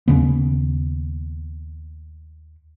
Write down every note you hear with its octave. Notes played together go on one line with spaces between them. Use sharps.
D#2 C#3 B3